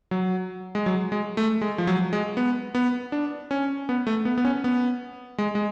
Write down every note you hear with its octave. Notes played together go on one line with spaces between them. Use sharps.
F#3
G#3
F#3
G#3
A3
G#3
F3
F#3
G#3
B3
B3
D4
C#4
B3
A3
B3
B3
C#4
B3
G#3
G#3